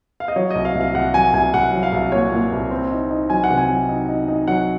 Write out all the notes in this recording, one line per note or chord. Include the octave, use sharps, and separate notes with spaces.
F5
D#5
F#3 C#5
C2 D#5
F5
C2
F5
C2 F#5
F#3 G#5
C2 G#5
C2 F#5
F#3
F5
C2
A#2 C#5
A#2
C2
C4
D#4
D#4
F#3 G#5
F#5
C3
G#5
F#3
D#4
D#4
D#4
F#3 F#5